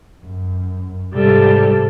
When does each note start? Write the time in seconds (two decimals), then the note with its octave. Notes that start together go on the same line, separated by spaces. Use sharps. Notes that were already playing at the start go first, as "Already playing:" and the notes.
0.23 F#2
1.14 G#2 C3 G3 A4